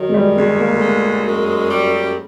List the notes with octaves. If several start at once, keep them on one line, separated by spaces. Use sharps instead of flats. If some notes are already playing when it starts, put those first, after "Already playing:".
Already playing: D#3 F#3
G#3
G3
D2 G#3
A#3
A3
G#3 A#3
F#2
G3